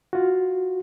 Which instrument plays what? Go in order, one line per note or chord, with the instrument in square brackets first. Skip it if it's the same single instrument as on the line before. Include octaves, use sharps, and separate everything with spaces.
[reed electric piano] F4 F#4